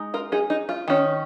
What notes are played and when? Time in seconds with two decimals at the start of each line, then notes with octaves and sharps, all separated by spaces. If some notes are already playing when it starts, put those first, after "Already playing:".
Already playing: G#3 D#4
0.14 F4 A#4
0.32 D#4 G#4
0.50 D#4
0.69 F4
0.88 D#3 C#4